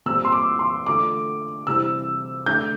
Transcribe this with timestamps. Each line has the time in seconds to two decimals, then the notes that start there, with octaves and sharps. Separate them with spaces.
0.06 A#2 G3 C4 E6
0.25 C6
0.32 D6
0.59 C6
0.87 D3 A3 D4 F4 D6
1.67 C3 E3 G3 C4 E6
2.46 D3 A3 D4 G6